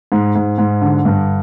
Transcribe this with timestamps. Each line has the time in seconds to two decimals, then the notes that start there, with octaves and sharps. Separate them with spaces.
0.12 G#2
0.35 G#2
0.58 G#2
0.82 D3
1.05 G2